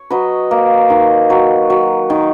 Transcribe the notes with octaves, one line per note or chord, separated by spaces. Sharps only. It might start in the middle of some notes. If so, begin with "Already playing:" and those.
Already playing: C#5
F#3 B4 D#5
A#3
D#3
F#3
F#3
D#3